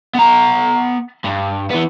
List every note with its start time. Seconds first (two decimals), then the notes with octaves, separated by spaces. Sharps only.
0.15 B3 A#5
1.25 G2
1.71 E3 B3